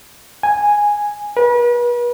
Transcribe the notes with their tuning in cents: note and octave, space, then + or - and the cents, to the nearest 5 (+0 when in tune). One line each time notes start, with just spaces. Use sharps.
G#5 -5
B4 -40